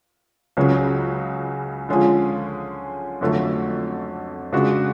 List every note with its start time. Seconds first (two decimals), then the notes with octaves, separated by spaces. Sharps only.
0.57 C#2 C#3 F#3 C#4 G#4
1.89 D3 F3 G#3 C#4 G#4
3.21 F2 D3 F#3 A3
4.53 C#3 G#3 D4 F#4